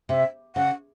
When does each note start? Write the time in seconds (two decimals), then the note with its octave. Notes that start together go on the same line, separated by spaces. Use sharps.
0.09 C3 E5
0.56 C#3 F#5